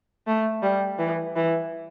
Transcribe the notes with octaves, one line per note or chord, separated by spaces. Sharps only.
A3
G3
E3
E3